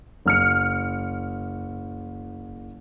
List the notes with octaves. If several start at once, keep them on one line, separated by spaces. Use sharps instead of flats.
F#1 F6 C#7